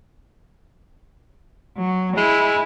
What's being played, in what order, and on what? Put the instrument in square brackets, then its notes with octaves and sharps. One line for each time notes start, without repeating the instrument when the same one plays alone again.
[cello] F#3
[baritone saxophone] G#3 [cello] E4